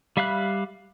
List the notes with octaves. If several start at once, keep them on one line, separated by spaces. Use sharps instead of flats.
G3 E5 F5 B5 F#6